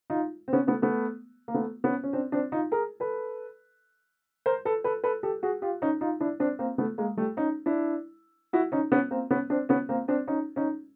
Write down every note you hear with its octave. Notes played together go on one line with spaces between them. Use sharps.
D#4 F4
C4
B3 C#4
A3 B3
A3 B3
A#3
A3 B3
B3 C#4
C#4
C4 D4
C4 D4
D#4 F4
G#4 A#4
A4 B4
A#4 C5
A4 B4
A4 B4
A4 B4
G4 A4
F#4 G#4
F4 G4
C#4 D#4
D#4 F4
D4 E4
C4 D4
A#3 C4
A3 B3
G#3 A#3
G3 A3
C#4 D#4
D4 E4
E4 F#4
C#4 D#4
B3 C#4
A#3 C4
B3 C#4
C4 D4
B3 C#4
A#3 C4
C4 D4
C#4 D#4
C#4 D#4